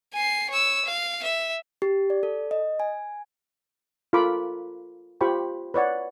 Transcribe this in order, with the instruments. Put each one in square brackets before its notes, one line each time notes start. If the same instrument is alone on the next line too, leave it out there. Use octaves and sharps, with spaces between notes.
[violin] G#5 C7
C#5 E6
F5
E5
[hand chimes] G4
D5
A4
D#5
G#5
[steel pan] F4 A4 A#4 B5 D6
F4 G4 C5 G5 B5 C#6
B4 C#5 D5 F#5